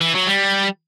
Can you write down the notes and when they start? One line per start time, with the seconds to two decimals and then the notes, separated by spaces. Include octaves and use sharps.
0.01 E3
0.14 F#3
0.27 G3